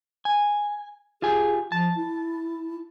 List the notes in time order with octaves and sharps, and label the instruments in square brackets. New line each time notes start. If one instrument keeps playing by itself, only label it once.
[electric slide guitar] G#5
[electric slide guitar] F4 G4 G#5 [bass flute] G#4
[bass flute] F3 [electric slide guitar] A5
[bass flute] E4